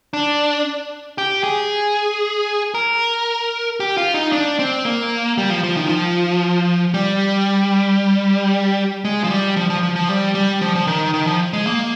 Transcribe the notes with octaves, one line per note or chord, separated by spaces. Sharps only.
D4
G4
G#4
A#4
G4
F4
D#4
D4
C4
A#3
G3
F3
F3
D#3
F3
G3
G#3
F3
G3
F3
F3
F3
F3
G3
G3
F3
F3
D#3
D#3
F3
G#3
A#3